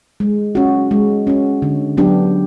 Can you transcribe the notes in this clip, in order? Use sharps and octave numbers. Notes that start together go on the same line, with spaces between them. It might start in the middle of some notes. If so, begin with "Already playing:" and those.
G#3
C#4 F#4
G#3
C#4 F#4
D3
F#3 B3 D4 G4